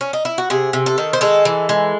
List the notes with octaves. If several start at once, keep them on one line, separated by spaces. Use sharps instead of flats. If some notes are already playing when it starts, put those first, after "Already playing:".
C#4
D#4
E4
F#4
C3 G#4
C3
A4
D#3
C5
G#3 A4
E3
G#3